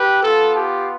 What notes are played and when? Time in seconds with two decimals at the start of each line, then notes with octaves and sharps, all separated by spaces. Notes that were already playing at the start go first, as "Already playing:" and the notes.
Already playing: G4 B4
0.23 B3 F4 A4
0.56 G4